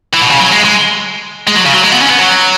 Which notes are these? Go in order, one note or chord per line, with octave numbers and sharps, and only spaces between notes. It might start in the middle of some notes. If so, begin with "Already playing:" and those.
E3
B2
C#3
F#3
G#3
G#3
G#3
F#3
C#3
F#3
G#3
B3
C#4
B3
F#3